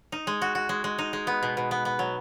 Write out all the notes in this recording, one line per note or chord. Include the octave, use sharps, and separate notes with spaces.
D#4
G#3
F#4
F#4
G#3
G#3
D#4
G#3
B3
B2
B2
B3
B3
F#3